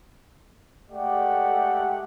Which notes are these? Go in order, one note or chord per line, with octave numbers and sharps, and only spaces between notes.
G#3 A3 G4 D5 F#5